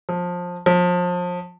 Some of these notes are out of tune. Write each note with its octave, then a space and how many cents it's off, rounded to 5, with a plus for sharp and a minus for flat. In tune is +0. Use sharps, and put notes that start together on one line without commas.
F3 +20
F3 +30